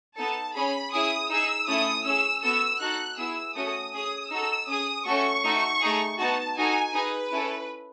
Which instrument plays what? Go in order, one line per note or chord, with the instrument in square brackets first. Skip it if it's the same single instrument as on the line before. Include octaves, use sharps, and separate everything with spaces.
[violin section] B3 D#4 A4 A5
C#4 G#4 B5
C#4 E4 G#4 D#6
D#4 G#4 E6
A3 C#4 E4 A4 D#6
C#4 G#4 E6
B3 F#4 A4 E6
D#4 F#4 A4 F#6
B3 E4 G#4 E6
A3 C#4 F#4 A4 D#6
C#4 G#4 D#6
D#4 F#4 A4 E6
C#4 G#4 D#6
A3 C#4 F#4 A4 C#6
A3 D#4 F#4 A4
A3 D#4 G#4
B3 D#4 F#4 A5
D#4 F#4 A4 G#5
D#4 G#4 B4
C#4 E4 A4